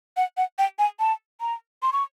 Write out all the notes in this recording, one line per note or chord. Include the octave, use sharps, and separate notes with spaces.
F#5
F#5
G5
G#5
A5
A#5
C6
C#6